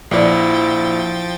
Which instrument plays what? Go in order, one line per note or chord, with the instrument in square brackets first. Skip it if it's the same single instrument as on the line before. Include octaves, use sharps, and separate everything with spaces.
[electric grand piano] A#1 [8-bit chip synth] F3 G5 A6 [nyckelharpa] E4 [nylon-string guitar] C5 D5